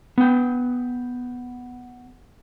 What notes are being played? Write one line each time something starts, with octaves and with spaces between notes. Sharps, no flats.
B3 G5